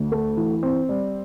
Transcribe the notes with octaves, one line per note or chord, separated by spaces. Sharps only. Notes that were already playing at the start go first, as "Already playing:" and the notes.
Already playing: D2
A3
E3
C4
G3